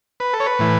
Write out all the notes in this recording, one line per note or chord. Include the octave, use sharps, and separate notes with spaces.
B4
A4
C#5
B4
A2 E3